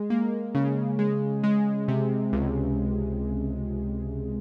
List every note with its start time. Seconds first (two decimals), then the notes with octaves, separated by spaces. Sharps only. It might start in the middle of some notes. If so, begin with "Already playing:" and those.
Already playing: G#3
0.10 A#3
0.55 C#3
0.99 G#3
1.43 G#3
1.88 C3
2.32 C#2